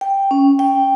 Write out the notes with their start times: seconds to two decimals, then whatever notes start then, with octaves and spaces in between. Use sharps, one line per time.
0.01 G5
0.31 C#4
0.59 G5